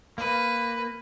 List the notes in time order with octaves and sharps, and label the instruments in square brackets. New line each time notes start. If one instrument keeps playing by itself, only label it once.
[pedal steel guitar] A#3 [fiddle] B4